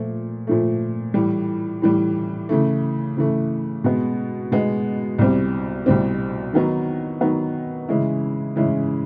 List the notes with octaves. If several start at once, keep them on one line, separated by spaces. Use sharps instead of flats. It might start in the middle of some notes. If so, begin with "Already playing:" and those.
Already playing: A#2 F3 A3
A#2 F3 A3
A2 E3 G3
A2 E3 G3
C#3 E3 A3
C#3 E3 A3
B2 G#3 B3
B2 G#3 B3
C2 B2 G3 C4
C2 B2 G3 C4
D#3 F#3 B3 D#4
D#3 F#3 B3 D#4
C#3 E3 G#3 C#4 E4
C#3 E3 G#3 C#4 E4